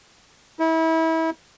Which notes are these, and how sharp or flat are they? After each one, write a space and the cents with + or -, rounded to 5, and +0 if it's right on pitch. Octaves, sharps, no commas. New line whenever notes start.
E4 -30